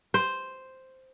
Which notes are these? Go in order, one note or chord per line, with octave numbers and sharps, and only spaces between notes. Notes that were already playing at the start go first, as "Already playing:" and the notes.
C5